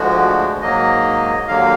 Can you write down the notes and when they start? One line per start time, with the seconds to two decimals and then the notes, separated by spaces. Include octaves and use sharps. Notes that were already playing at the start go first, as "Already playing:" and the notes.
Already playing: D2 D3 F3 G#3 F#4
0.62 G#2 F#3 A#3 D#5
1.48 D#2 D3 F#3 A#3 F5